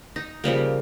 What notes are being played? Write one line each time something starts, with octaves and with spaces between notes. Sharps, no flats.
D#4
C#3 F3 G3 A#3